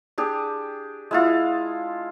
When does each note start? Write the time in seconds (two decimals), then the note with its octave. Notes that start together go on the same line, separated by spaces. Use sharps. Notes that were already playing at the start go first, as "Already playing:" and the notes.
0.18 D4 G4 G#4
1.11 G#3 E4 F4